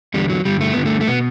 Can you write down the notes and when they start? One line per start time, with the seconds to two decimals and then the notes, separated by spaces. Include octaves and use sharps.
0.14 E2 D3 G3
0.30 F#3
0.45 G2 D3 G3
0.61 A3
0.73 G2 D3 B3
0.86 A3
1.01 A3
1.07 B2 B3